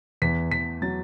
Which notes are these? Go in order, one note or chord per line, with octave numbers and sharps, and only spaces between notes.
E2 B6
E2 B6
F#3 A6